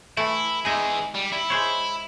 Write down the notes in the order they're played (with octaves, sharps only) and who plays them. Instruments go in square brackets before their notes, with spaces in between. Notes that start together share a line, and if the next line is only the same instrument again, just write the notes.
[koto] E3 A3 [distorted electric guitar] E4
[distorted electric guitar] E3 G#4 [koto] G#3 D#4 E5
[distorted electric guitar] G3
E4
[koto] G#3 C5 C#5